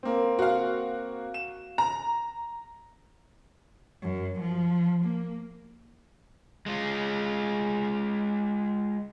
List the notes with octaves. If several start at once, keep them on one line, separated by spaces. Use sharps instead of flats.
A#3 C4
F#4 F5
E7
A#5
F#2
F3
A#3
G#3 F4